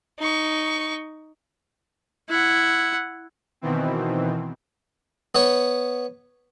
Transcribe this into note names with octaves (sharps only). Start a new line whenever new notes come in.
D#4 C#6
E4 F#5
B2 D#3 E3 C4
B3 C#5